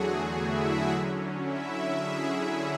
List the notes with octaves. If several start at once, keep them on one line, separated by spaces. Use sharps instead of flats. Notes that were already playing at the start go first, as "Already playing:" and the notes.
Already playing: E2 D3 F#3 A3 F#4 G#4
E4 E5
D3 F#3 C#4
E4 E5
G#4